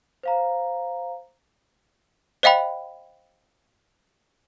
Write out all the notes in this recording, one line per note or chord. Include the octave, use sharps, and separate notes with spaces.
C5 F5 A#5
C5 D#5 F5 G5 B5